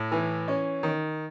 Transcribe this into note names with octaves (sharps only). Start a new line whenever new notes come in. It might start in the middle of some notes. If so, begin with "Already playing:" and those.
Already playing: A2
E3
C#4
D#3